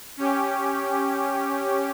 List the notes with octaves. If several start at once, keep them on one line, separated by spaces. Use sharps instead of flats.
C#4 G4